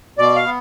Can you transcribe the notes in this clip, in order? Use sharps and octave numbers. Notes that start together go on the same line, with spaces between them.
B2 D5
F5
B3